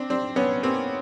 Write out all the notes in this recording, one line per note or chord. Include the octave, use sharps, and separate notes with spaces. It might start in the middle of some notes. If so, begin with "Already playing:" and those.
Already playing: C4 D4
C4 D4
B3 C#4
A#3 C4